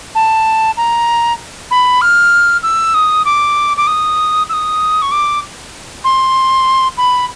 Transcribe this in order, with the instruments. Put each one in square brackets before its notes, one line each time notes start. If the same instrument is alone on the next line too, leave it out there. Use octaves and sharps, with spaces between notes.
[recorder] A5
A#5
B5
F6
E6
D#6
D6
D6
D#6
E6
D#6
C#6
D6
C6
B5